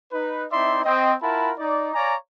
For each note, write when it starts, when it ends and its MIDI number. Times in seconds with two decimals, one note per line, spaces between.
0.12 0.44 63
0.12 0.44 71
0.52 0.83 60
0.52 0.83 63
0.52 0.83 64
0.52 0.83 74
0.52 0.83 76
0.52 0.83 84
0.84 1.14 60
0.84 1.14 75
1.21 1.52 64
1.21 1.52 65
1.21 1.52 70
1.21 1.52 78
1.21 1.52 81
1.21 1.52 83
1.58 1.90 63
1.58 1.90 74
1.94 2.15 73
1.94 2.15 74
1.94 2.15 77
1.94 2.15 80
1.94 2.15 82